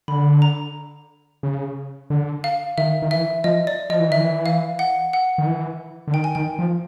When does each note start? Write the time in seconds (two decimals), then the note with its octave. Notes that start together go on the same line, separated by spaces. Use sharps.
0.08 D3 B5
0.42 A#5
1.43 C#3
2.10 D3
2.44 F5
2.78 D#3 E5
3.02 D#3
3.11 E3 E5
3.44 F3 D#5
3.67 D5
3.90 F3 D#5
4.00 E3
4.10 D#3 E5
4.20 E3
4.46 F5
4.79 F#5
5.13 F#5
5.38 D#3
5.47 E3
6.08 D3
6.13 D#3 G5
6.24 G#5
6.35 D#3 G5
6.59 F3